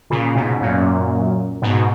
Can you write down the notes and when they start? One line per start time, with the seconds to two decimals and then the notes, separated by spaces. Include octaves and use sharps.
0.10 A#2 C#3
0.35 G#2 B2
0.61 F#2 A#2
1.62 G#2 B2